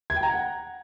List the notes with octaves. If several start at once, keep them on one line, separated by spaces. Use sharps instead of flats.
G#6
G5
A#5
F#5